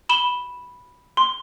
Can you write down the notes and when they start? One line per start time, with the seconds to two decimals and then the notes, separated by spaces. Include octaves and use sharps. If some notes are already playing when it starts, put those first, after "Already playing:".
0.09 B5 E7 G7
1.17 C6